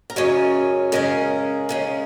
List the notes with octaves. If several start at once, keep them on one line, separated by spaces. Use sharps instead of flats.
A#4
F#2 C#3 G#3 C#4 C#5
C#3 G#3 C#4 A#4
C#3 G#3 C#4